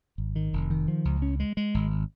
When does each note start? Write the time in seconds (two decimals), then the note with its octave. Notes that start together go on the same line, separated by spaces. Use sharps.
0.18 G#1
0.36 D#3
0.53 F1
0.70 D#3
0.88 F3
1.05 C#2
1.22 C#4
1.40 G#3
1.57 G#3
1.74 G#1